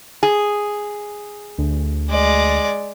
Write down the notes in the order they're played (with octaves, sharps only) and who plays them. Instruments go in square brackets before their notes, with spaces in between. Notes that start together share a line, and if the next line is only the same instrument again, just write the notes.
[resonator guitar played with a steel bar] G#4
[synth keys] D2
[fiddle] G#3 D5